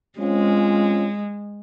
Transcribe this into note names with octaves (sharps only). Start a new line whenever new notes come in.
G#3 C4 C#4 F4